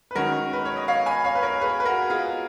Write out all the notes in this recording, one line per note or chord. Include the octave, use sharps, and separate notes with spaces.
B4
D#3 G#3 C#4 F#4 A#4
B4
C#5
D#5
C#5 F5
G#5 B5
C#5 F5
B4
A#4 C#5
G#4 B4
B4
F#4 A#4
F4 G#4